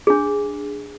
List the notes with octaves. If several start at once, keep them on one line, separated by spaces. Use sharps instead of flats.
D4 G#4